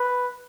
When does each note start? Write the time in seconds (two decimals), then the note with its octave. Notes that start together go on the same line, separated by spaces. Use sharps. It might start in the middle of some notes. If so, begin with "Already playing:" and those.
Already playing: B4